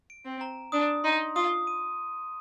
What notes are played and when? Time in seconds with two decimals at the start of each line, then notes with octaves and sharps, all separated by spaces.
0.10 D7
0.25 C4
0.41 A#5
0.72 D4 D#6
1.04 D#4 C6
1.36 F4 D#6
1.67 D#7